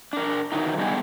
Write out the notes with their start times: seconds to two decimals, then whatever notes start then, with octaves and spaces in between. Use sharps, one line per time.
0.13 D4 A#4
0.52 D#3 E3 F#3 D#4
0.77 D3 G3 G#3 B3 G4 G#4